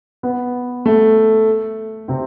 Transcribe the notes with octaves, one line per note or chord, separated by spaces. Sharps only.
B3
A3
C3 C4